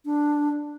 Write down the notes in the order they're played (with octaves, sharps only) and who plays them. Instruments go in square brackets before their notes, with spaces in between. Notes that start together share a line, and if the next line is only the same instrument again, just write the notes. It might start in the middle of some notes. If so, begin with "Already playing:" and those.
[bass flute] D4